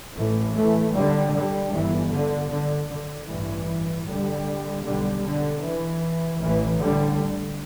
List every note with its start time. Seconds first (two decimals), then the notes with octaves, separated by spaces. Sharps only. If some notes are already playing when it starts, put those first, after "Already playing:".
0.14 A1 A2 E3 A3
0.54 E3 A3
0.93 D3 G3
1.32 D3 G3
1.72 G1 G2 E3
2.11 D3
2.49 D3
2.89 D3
3.27 A1 G2 E3
4.05 D3 G3
4.83 B1 B2 D3 G3
5.22 D3
5.62 E3
6.39 A1 A2 E3
6.78 D3 G3